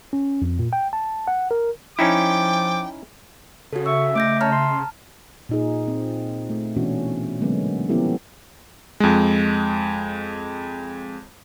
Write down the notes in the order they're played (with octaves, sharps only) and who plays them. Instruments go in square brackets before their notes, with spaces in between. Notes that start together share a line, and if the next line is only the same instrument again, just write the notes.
[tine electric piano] C#4
F2
A#2
G5
A5
F#5
A#4
[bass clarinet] F3 [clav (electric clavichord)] C#4 D#4 E4 [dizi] G5 [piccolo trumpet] D6
[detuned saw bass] C#3 [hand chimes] F#4 A4
[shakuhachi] E5 [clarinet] C#6 [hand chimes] E6
[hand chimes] A3 G6 A#6 [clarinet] D6
[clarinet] C#5 [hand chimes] A5 A#5 F6
[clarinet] C6
[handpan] A#2 D#4 G#4
C4
A3
B2 E3 C#4 D4 F#4
D3 F#3 G#3 A#3 B3 C#4
F3 B3 C#4 E4 G4 A4
[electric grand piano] F2 G#3